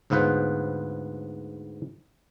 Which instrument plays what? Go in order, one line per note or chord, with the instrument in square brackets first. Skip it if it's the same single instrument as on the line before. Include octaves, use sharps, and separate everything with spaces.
[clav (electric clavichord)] D2 G#2 B3 F4 B4 C5